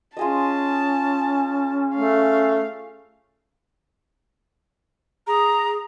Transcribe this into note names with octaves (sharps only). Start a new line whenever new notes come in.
C#4 F4 G#4 D#5 A5
A3 F5
G#4 A#5